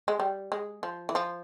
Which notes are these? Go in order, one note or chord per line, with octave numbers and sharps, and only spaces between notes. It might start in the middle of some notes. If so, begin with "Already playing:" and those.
G#3
G3
G#3
F3
E3
F3